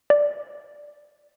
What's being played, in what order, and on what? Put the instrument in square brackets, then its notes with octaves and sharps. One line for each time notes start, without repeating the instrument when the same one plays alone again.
[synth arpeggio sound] D5